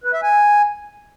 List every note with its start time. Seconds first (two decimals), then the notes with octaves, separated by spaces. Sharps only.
0.04 B4
0.13 E5
0.23 G#5